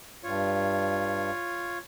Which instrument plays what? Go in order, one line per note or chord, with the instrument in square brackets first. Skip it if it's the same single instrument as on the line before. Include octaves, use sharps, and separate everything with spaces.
[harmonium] G2 [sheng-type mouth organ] F4 C#5